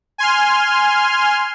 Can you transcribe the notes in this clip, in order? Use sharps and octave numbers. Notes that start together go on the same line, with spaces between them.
G#5 C6 F6